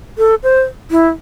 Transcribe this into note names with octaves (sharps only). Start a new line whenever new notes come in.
A4
C5
E4